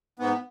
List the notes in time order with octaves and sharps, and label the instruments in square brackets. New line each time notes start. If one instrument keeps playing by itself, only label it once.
[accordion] G#2 B3